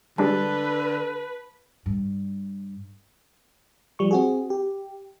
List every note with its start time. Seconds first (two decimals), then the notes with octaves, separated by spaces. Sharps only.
0.18 D3 G3 G#3 D4 B4 A5
1.86 G2
3.99 F3 G3 C#6
4.11 C4 F#4 G#4
4.50 G4